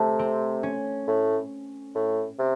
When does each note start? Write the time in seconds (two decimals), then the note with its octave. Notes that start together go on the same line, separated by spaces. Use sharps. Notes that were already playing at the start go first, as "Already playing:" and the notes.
Already playing: C3 A3
0.19 C4
0.63 C#4
1.07 A2
1.95 A2
2.39 C3